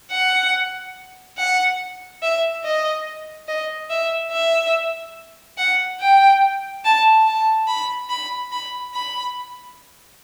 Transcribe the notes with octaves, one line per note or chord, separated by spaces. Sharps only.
F#5
F#5
E5
D#5
D#5
E5
E5
F#5
G5
A5
A5
B5
B5
B5
B5